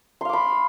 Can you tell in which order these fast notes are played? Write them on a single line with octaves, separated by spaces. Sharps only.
C6 F5 D6 B5